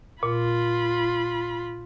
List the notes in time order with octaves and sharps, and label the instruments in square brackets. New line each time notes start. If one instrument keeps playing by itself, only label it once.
[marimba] A#2 [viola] F4 B5